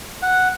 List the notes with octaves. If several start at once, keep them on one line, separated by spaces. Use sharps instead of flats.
F#5